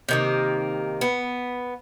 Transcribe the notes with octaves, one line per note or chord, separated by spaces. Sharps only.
C3 D#3 A#3
B3